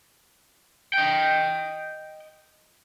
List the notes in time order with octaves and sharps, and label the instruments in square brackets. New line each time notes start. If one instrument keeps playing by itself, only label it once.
[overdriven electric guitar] D#5 G5